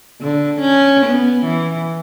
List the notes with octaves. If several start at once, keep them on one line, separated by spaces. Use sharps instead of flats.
D3
C#4
B3
E3